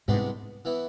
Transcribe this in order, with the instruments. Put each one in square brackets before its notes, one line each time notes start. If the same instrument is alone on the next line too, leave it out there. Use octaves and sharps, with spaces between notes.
[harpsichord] C2 C3 G#3 B3 D4 [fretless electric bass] G#2
[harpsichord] E3 B3 E4